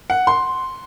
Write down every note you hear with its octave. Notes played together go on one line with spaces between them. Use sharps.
F#5
C6